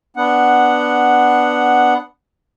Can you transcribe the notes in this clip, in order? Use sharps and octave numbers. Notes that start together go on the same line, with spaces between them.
B3 D4 F#5